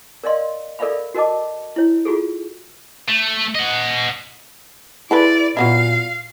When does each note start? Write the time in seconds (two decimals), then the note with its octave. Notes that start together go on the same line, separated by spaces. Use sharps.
0.24 A#4 D5 D#5 F5 C6
0.79 A4 A#4 D5 E5 F5 B5
1.14 F#4 A#4 D#5 A5 D6
1.76 E4 C#5
2.05 F4 F#4 G#4 A4
3.09 A3
3.55 D#5 F#5
5.11 E4 G#4 A4 B4 D5
5.57 A#2 F#3 B3 E4 F5